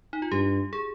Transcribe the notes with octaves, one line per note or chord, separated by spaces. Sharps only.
D#4
F4
G2 G4
G#4